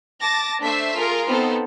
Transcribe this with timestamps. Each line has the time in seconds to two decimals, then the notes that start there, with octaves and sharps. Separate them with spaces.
0.21 A5 D6 A6 A#6
0.62 A3 D4 C5 E5 B6 C7
0.96 F4 G#4 A#4
1.27 B3 C4 D#4 F4 A4 C5